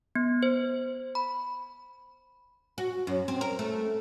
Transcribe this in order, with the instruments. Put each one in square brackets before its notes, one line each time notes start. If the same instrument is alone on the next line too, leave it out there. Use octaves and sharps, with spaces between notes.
[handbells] B3
C5
B5
[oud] F#4
F#2
C4
A#4
A3